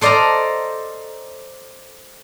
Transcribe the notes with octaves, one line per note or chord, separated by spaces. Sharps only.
A4 C5 D5 D#5 F5 A#5